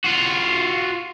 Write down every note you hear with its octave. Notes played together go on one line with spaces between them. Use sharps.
F4 F#4